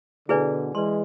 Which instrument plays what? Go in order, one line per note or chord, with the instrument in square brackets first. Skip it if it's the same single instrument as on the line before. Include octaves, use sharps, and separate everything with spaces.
[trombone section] B2 D3 [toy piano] E4 G#4 B4 D5 G#5
[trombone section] E3 G#3 [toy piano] B4 D5 A5 C6